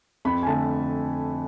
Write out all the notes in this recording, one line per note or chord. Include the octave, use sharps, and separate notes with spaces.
F2 B5
G#5
D3 A3 A5